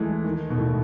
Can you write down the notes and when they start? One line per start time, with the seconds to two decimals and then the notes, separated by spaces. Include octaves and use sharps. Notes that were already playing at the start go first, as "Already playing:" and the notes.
Already playing: E3 G#3 A3
0.24 D#3
0.50 B2
0.58 A2